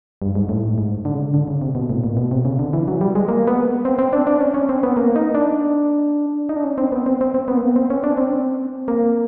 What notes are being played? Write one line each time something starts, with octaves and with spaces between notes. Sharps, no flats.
G2
G#2
A2
G#2
D3
C#3
D3
D3
C#3
C3
B2
A2
A#2
B2
C3
C#3
D3
E3
F#3
G3
G#3
A#3
B3
C4
C4
D4
D4
C#4
C#4
C4
B3
A#3
D#4
D4
D#4
D4
C#4
C4
B3
C4
C4
C4
B3
A#3
B3
C4
C#4
D4
C4
A#3